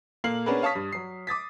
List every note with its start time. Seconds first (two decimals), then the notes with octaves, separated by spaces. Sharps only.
0.24 A#2 A#3 A4 F6 C7 F#7
0.46 B3 C#4 D4 G#4 A#4 B4
0.62 C#5 F5 A5 C#6 D#6 B6
0.75 G2
0.92 F#3 C7
1.27 D6 D#6 A6 B6